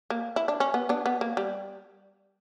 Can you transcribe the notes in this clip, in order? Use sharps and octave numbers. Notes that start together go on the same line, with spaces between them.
A#3
E4
D4
C#4
B3
B3 D4
B3
A#3
G3